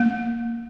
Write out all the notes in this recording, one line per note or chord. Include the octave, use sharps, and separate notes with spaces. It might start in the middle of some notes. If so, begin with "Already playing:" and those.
Already playing: A#3